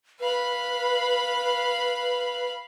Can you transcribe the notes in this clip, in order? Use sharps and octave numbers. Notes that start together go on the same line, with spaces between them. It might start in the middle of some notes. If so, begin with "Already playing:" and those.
B4 F5 B5